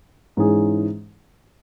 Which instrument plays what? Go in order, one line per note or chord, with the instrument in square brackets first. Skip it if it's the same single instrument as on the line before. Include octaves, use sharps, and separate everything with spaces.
[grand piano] G#2 E3 C#4 G#4